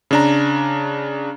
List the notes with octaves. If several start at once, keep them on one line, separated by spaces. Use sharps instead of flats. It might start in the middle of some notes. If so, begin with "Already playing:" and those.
C#3 D4 A#5